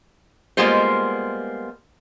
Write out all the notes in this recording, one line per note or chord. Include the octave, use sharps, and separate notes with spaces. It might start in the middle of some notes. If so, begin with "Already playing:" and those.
G3 G#3 A#3 B3 F4 C5